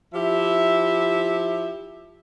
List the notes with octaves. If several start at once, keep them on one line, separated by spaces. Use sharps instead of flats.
F3 E4 G4 E5